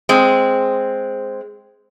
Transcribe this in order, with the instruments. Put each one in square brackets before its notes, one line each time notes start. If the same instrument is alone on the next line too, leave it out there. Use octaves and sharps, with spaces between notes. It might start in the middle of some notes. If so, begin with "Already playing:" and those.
[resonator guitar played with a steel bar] G#3 C4